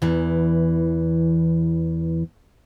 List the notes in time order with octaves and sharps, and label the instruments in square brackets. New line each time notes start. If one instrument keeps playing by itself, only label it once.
[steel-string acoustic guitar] E2 E3